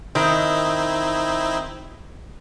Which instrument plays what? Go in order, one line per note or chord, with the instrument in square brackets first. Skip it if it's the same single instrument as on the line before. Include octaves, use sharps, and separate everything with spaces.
[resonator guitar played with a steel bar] D#3 [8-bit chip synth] C4 D#4 E4